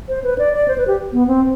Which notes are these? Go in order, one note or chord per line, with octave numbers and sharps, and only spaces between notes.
C5
B4
D5
D5
C5
B4
G4
B3
C4